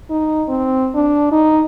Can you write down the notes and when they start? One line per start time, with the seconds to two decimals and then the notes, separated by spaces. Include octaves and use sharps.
0.10 D#4
0.49 C4
0.94 D4
1.32 D#4